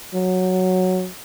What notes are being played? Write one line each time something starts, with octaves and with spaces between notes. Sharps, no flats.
F#3